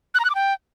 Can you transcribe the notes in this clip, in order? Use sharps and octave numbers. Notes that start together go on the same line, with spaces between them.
F#6
A#5
F#6
D6
G5